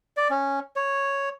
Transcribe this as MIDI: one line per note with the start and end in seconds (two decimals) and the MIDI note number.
0.17 0.28 74
0.30 0.60 61
0.76 1.29 73